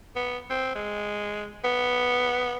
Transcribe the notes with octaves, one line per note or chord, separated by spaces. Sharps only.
B3
C4
G#3
B3